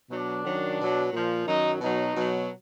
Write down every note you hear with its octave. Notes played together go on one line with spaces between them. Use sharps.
B2 F#3 D4
F#2 D#3 F#3
B2 F#3
A#2 F3
F#2 D#3 F#3 D#4
B2 F#3 D#4
B2 F#3